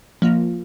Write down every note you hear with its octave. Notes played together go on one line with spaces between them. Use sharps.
F3 A#3 F4